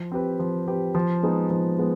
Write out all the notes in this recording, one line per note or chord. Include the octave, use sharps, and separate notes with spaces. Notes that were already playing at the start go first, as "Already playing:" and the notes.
Already playing: F3
C4 G4 B4
F3
C4 G4 B4
F3
G#3 B3 D#4 G#4
F3
G#3 B3